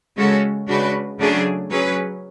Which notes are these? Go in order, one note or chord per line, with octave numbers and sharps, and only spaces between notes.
C#3 G#3 C#4 F#4 A4
C#3 G#3 D4 F#4 B4
C#3 F#3 A3 D4 G#4
F#3 C#4 G#4 B4